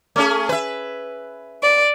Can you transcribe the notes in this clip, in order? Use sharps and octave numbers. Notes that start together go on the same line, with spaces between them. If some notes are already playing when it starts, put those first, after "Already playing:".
A3 C#4 G#4
B4 E5
D5